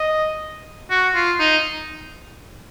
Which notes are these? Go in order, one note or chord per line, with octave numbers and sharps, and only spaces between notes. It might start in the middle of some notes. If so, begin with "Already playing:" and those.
Already playing: D#5
F#4
F4
D#4